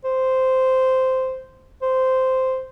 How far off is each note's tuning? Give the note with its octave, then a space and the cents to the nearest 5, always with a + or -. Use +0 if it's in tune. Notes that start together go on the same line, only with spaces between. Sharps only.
C5 -10
C5 -10